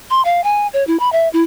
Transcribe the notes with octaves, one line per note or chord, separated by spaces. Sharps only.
C6
F5
G#5
C#5
E4
B5
E5
E4